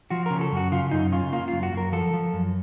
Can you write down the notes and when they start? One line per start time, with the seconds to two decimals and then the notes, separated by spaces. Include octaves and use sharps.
0.10 F3 F#4
0.26 C#3 A#4
0.41 A4
0.52 F#2
0.57 F#4
0.72 C#3 F4
0.91 F#2 D#4
1.12 C#3 F4
1.32 A#3 F4
1.48 F#2 F4
1.63 F#4
1.73 F#2 A#4
1.93 F3 A4
2.13 F3
2.33 F#2